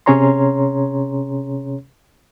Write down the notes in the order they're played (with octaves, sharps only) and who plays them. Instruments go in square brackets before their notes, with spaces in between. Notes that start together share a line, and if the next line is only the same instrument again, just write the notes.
[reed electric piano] C3 C#4 G#4 C#5 A#5 C6